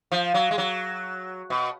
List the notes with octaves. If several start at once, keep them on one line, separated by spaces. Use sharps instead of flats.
F3
F#3
G#3
F#3
B2